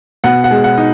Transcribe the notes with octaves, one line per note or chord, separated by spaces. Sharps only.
B2 F#5
F#5
G#3
F#5
D#4